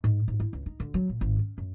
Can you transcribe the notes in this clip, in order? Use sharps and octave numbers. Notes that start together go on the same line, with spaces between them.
G#2
G#2
E4
C#2
D#4
D3
F#3
A#2
G#1
C#4
F#2